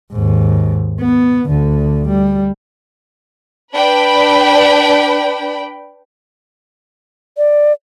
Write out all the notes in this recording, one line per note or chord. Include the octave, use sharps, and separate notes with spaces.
D#2 G#2
B3
D2 D3
G3
D4 B4 G5 B5
D5